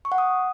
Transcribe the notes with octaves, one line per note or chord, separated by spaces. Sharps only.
C#6
F#5
D#6